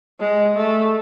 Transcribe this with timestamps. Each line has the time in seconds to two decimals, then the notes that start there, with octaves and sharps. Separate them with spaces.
0.20 G#3
0.56 A3